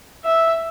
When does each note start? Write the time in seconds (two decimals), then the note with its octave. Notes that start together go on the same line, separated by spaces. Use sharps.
0.25 E5